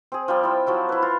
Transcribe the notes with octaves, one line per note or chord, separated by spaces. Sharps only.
C4 G#4
F3 G3 G5
E4 F4
F3 F#3 E4
E4 B4
F4